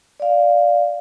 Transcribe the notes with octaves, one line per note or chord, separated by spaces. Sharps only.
D5 F5